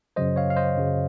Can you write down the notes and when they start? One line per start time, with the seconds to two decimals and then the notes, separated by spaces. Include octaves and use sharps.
0.16 F#2 C#3 F#3 C5 D#5
0.36 C#5 F5
0.50 F5
0.56 C5 D#5
0.77 F#2 C#3 F#3